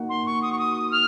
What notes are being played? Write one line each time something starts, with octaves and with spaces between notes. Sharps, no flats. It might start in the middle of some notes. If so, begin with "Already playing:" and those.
Already playing: A#3 D#4 F#4
C6
C#6
D#6
C#6
D#6
F6